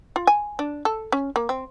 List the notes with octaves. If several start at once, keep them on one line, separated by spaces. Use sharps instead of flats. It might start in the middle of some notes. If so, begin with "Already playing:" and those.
F4
G#5
D4
A4
C#4
A#3
C4